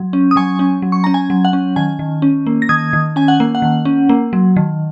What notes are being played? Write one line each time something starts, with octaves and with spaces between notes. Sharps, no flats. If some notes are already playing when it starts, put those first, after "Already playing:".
Already playing: F#3
C#4
D#6
F#3 G#5 C#6
C#4
F#3
C#6
C#4 A#5
G#5
F#3
F#5
C#4
D#3 G#5
D#3
C#4
A#3
A#6
D#3 D#6 G#6
D#3
C#4 G#5
F#5
A#3
F#5
D#3
C#4
A#3
F#3
D#3